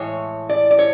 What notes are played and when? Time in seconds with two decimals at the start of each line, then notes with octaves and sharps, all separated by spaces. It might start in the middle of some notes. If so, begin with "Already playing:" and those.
Already playing: A2 E3 G#3 C#5
0.49 D5
0.71 D5
0.79 C#5